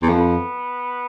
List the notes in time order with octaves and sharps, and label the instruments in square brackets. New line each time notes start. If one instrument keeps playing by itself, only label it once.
[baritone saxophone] E2
[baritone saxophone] F2 [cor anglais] B3